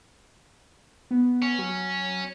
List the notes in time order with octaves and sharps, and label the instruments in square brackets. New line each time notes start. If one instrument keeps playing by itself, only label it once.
[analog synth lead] B3
[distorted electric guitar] C#4
[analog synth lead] F#3